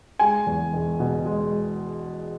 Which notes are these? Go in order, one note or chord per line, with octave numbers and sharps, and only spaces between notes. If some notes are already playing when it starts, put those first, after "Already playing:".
G#3 G#5
E2
E1
B2
G#3